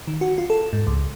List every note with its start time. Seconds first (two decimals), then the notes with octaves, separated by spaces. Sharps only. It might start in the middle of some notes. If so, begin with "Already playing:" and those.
0.07 D#3
0.21 F#4
0.38 F4
0.50 A4
0.73 G#2
0.87 C#2